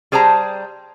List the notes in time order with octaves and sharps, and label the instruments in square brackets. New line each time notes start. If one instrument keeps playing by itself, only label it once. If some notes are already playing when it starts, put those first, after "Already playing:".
[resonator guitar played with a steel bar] G3 G#4 C5 A5 A#5